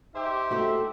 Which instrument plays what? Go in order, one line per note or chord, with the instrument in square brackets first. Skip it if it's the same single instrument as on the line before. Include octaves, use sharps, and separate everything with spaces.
[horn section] D#4 C5 E5 [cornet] G4
[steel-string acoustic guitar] A3 F#4